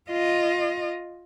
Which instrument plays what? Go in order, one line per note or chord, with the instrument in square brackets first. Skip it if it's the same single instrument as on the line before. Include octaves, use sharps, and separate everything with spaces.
[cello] F4 D#5